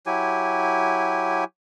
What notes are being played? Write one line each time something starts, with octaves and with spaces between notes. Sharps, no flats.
F#3 E4 G4 G#5